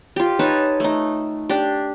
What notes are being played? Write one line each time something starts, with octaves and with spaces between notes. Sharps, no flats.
F4 G4
D#4 B4 C#5 A5
A3 D#4
D4 G4